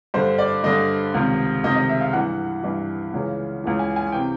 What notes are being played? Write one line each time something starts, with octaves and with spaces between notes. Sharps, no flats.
G2 D3 C5
D5
G2 D3 D#5
C#2 C3 D#3
C#2 C3 D#3 D#5
D#5
E5
F5
G2 E3 F#5
G2 E3
C#2 C#3 E3
C#2 C#3 E3
G#5
G#5
C3 E3 G5